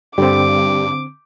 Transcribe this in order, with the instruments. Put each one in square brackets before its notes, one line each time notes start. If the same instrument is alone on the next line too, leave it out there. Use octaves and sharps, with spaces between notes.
[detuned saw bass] G2 [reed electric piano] D3 C4 [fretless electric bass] G3 [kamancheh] D6